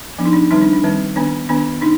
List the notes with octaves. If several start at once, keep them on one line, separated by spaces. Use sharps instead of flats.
F3 B3 D4
D#4
D4
D#3 G3 C4 D#4
D4
D4
D#3 G3 C4
D#3 B3 D4
D#3 B3 D4
D4 D#4